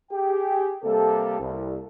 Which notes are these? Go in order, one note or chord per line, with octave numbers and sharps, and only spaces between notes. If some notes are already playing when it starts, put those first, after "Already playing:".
G4 G#4 G5
C3 G3 A#3 G4 A4
C2